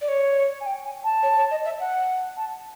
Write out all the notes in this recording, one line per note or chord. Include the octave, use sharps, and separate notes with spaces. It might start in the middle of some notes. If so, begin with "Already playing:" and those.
D5
C#5
G#5
G5
G#5
A5
C#5
C#5
D#5
E5
F#5
A5